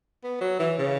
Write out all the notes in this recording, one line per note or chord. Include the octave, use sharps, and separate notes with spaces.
B3
F#3
E3
C#3